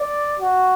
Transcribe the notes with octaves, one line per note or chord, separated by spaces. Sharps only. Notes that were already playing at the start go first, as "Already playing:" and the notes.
Already playing: D5
F#4